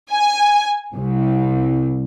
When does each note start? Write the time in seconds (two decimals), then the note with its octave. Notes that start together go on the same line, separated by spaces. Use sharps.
0.11 G#5
0.96 C2